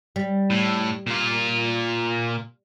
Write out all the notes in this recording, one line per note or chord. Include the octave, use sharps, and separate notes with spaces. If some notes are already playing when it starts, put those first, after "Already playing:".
G3
A2
A#2 F4